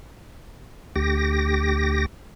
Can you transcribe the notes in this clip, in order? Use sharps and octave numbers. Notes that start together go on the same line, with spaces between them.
D2 G4 A#6